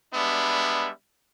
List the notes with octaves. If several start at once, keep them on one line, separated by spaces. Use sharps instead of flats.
G3 G#3 B3 D4 E5